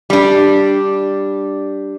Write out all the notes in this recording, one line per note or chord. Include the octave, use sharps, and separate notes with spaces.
G3 D4